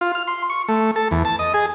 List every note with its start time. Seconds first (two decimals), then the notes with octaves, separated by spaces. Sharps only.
0.01 F4
0.15 F6
0.27 C6
0.50 C#6
0.68 A3
0.96 A4
1.11 E2
1.25 A5
1.39 D#5
1.54 G#4